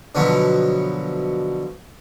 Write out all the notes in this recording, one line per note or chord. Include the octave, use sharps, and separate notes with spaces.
B2 D3 F3 F#3 B3